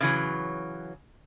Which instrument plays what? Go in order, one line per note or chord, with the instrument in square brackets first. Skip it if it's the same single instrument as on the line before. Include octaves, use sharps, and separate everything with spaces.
[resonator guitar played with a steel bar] C#3 E3 F#3